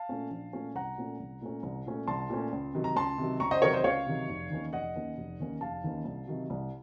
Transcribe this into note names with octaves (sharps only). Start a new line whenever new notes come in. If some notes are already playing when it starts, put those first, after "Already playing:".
Already playing: F5 A5
A#2 A3 C#4
A#1
A#2 A3 C#4
C2 F#5 A#5
A#2 A3 C#4
C2
A#2 A3 C#4
C2
A#2 A3 C#4
C2 A5 C6
A#2 A3 C#4
C#2
C3 D#3 F#3
A#5
C#2 A5 C6
C3 D#3 F#3
C#2 A#5 C#6
C5 D#5
C3 D#3 F#3 A#4 C#5
C5 D#5
C#2 C#5 F5
C3 D#3 F#3
F1
D#2 D#3 A#3 C#4
F1 D#5 F#5
D#2 D#3 A#3 C#4
F1
D#2 D#3 A#3 C#4
F1 F5 A5
D#2 D#3 A#3 C#4
C2
C3 D#3 F#3
C2